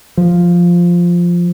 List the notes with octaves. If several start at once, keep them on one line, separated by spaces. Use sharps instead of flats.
F3